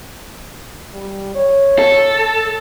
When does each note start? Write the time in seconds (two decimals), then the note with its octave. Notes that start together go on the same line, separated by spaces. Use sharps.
0.94 G3
1.35 C#5
1.79 A4